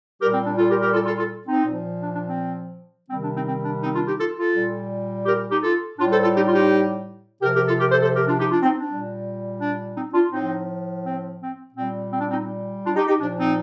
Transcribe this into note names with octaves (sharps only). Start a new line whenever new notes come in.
A#2 G3 G4 A#4
C4
D4
F4 A4
G4 A#4
G4 A#4
F4 A4
F4 A4
F4 A4
C4 D#4
A#2 F3
D4
D4
C4
C3 D#3 G3 C4
D4
C4 D#4
C4
D4
C4 D#4
D4 F4
D#4 G4
F4 A4
F4 A4
A#2 G3
G4 A#4
D#4 G4
F4 A4
A2 G3 D4 F4
A4 C5
F4 A4
D#4 G4
F4
D#4 G4
C3 F3 G4 A#4
G4 A#4
F4 A4
G4 A#4
A4 C5
A4 C5
G4 A#4
D4 F4
D#4 G4
D4 F4
C4 D#4
D4
A#2 G3
D4
C4 D#4
D4 F4
A2 F3 C4 D#4
C4
C4
A#2 G3 C4
C4
D4
C4 D#4
D4 F4
D#4 G4
D#4 G4
A#2 F3 D4
C4 D#4